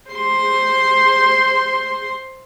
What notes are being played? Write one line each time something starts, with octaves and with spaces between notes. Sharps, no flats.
C5 C6